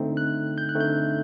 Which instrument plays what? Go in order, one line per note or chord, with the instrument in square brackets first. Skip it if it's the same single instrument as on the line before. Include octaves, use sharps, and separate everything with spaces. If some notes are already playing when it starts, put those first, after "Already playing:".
Already playing: [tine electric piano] D3 A3 C4 D#4
F#6
G6
F#6
D3 A3 C4 D#4
G6